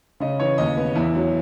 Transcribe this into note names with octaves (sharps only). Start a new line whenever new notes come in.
C#3 D#5
E3 C#5
D#2 D#5
B3
E2 E4
F#3